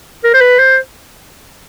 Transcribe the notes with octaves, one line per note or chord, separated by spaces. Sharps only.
A#4
C5
B4
C5